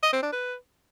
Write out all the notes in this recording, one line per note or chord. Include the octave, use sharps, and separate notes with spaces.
D#5
C4
D4
B4